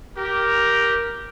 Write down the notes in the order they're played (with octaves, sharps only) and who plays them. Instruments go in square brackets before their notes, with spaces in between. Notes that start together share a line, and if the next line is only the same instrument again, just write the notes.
[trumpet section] G4 A#4